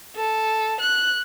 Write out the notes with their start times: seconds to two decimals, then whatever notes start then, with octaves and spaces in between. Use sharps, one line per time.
0.16 A4
0.80 F#6